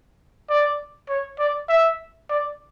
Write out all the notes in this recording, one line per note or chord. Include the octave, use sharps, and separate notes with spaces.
D5
C#5
D5
E5
D5